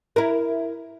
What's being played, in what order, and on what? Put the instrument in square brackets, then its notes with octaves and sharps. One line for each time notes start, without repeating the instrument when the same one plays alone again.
[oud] E4 A#4